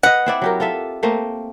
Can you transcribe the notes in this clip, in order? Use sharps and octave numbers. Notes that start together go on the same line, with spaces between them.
B4 D#5 F#5
C4 E4 D5
F#3 G4 A#4
F4 A4 E5
A3 A#3 C4